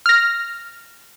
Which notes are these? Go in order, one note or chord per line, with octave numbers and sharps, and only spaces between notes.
F6 A#6